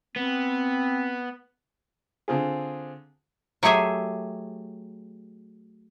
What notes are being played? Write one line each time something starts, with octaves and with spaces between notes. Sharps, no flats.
B3 C4
D3 C4 F4 G#4
F#3 A3 G4 G#4 E5